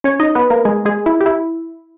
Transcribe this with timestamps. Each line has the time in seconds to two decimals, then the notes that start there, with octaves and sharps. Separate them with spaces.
0.04 C#4 C#5
0.20 D#4 D#5
0.35 B3 B4
0.50 A#3 A#4
0.65 G#3 G#4
0.85 G#3 G#4
1.06 E4
1.20 G4
1.26 E4